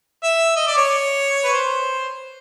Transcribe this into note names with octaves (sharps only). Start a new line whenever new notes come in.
E5
D#5
D5
C#5
B4
C5